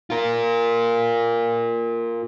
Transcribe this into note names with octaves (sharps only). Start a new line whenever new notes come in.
F4 A#4